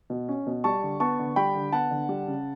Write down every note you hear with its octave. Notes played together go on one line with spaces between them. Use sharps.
B2
C#4
B2
G3 A5 C#6
D3
B3 A5 C#6
D3
G3 G5 B5
D3
B3 F#5 A5
D3
G3
C#3